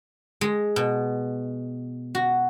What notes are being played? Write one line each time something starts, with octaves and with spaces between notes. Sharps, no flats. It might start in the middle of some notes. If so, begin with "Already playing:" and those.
G#3
B2
F#4